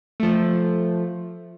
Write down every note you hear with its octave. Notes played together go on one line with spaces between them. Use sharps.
F3 A3